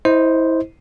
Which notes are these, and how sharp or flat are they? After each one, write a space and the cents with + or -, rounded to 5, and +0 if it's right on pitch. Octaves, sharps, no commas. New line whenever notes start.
E4 -25 C5 +0 D#5 +0